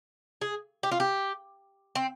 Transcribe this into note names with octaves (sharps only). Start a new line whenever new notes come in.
G#4
G4
F4
G4
C4